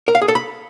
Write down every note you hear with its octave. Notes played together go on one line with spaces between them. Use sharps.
A#4
F5
G#4
A4
B5